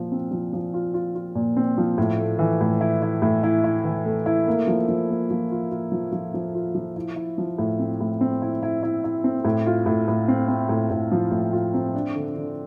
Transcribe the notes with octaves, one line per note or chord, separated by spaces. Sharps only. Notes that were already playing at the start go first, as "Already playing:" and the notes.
Already playing: A#2 F3 F4
C4
F3
F3
F4
F4
F4
A#2
C4
F3
A2
A3
E3
A2
E4
E4
A2
E4
E4
E3
A3
E4
A#3
F3
F3
A#3
F3
F4
F4
F3
F3
F3
F4
F3
E4
E4
F3
A2
C4
A2
C4
E4
E4
E4
E4
C4
A2
F4
A2
A2
C4
C4
A2
A2
F3
A2
F4
C4
D4
D3
D3